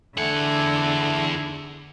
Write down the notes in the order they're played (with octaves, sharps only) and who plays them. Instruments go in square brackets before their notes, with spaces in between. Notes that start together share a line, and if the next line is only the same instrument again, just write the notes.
[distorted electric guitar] E2 F#5 [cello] D3 [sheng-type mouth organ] A3 A4 G#5